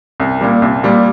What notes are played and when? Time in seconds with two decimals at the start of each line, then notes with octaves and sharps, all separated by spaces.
0.20 C2
0.41 A#2 G3
0.62 C2
0.84 A#2 G3